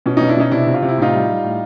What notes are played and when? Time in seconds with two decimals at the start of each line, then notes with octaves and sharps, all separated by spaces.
0.06 B2 C#4
0.17 B2 C#4 D#4
0.28 D4 E4
0.36 B2 C#4 D#4
0.51 C3 D4 E4
0.67 C3
0.74 F4
0.82 C3
0.89 E4
0.97 A2 D#4 F4
1.13 G3
1.28 G3
1.44 A2